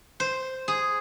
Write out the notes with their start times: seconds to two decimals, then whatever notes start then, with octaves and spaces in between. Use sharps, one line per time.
0.20 C5
0.68 G#4